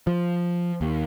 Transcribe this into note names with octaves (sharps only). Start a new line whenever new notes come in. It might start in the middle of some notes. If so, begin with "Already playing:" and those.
F3
D#2